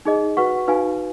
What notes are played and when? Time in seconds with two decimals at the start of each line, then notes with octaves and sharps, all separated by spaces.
0.05 D#4 G#4 D#5
0.37 F#4 B4 F#5 C#6
0.68 D#4 F#4 B4 F5 G#5